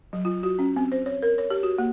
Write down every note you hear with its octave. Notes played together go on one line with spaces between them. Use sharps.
F#3
F4
F#4
C#4
C4
C5
C#5
A#4
C#5
G4
F#4
A#3